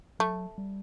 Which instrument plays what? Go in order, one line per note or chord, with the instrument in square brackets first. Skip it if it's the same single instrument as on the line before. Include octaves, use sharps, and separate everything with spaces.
[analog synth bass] F#3 [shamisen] A3
[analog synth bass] G3